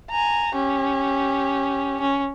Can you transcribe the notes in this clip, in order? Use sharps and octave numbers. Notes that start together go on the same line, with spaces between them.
G#5 A#5
C#4 G4
C#4